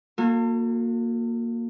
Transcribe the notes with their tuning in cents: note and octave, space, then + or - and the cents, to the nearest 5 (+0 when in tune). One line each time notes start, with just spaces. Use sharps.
A#3 +0 F#4 -40 A4 +45